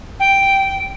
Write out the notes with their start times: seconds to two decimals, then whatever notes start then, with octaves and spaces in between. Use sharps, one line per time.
0.20 G5